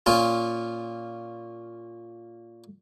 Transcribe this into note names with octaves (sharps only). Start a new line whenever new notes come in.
A#2 C#4 F4